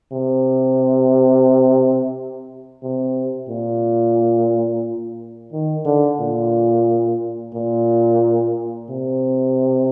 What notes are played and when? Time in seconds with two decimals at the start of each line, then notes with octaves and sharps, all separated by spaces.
0.12 C3
2.83 C3
3.49 A#2
5.52 D#3
5.85 D3
6.20 A#2
7.54 A#2
8.90 C3